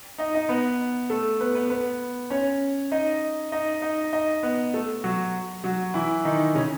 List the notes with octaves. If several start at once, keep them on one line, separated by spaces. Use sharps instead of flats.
D#4 D#5
D#4 D#5
B3 B4
A3 A4
B3 B4
B3 B4
B3 B4
C#4 C#5
D#4 D#5
D#4 D#5
D#4 D#5
D#4 D#5
B3 B4
A3 A4
F#3 F#4
F#3 F#4
E3 E4
D#3 D#4
C#3 C#4